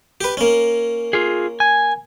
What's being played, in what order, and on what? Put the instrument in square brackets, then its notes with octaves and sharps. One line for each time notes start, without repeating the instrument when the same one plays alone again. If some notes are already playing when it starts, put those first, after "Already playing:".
[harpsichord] G4 B4
A#3 C#4
[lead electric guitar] F4 G#4
G#5